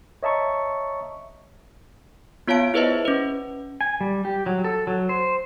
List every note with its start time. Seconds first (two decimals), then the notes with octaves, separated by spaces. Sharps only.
0.23 C#5 D#5 E5 A5 A#5 C#6
2.47 B3 F4 C#5 F5 A5 D7
2.74 E4 G#4 B4 C5 D#5 E5
3.05 C#4 B4
3.81 G#5
4.01 G3
4.25 G4
4.46 F#3
4.64 A4
4.87 F#3
5.09 C5